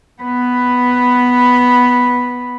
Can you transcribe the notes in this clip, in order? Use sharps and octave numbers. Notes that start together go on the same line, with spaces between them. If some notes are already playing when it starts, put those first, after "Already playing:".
B3 B4